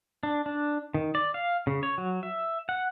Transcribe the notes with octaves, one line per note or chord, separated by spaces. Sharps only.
D4
D4
D#3
D5
F5
C#3
C#5
F#3
E5
F#5